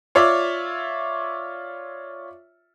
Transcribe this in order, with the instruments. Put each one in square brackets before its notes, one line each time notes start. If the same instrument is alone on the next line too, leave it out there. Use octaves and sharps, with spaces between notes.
[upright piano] F4 C#5 D5 E5